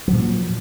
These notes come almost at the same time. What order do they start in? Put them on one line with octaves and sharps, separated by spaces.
F#3 F3 A#2